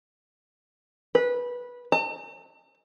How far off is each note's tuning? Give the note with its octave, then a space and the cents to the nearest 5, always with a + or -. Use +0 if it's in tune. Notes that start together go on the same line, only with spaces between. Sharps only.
B4 -15
A5 +45